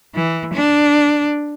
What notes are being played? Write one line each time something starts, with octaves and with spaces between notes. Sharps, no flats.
E3
D4